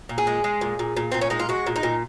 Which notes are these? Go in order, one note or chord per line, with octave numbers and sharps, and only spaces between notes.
A#2
G#4
G#3
G#3
A#2
A#2
A#2
A#2 C4
C#4
G#3 D#4
F4
G#3 F#4
A#2
D#4
A#2